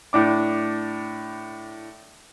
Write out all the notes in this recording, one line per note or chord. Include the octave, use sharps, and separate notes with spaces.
A2 D4 D6